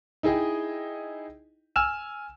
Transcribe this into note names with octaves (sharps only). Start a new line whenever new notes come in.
D#4 E4 G#4 D#5 G5
G#5 E6 F6 E7